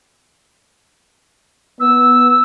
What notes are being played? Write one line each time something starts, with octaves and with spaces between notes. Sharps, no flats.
B3 E6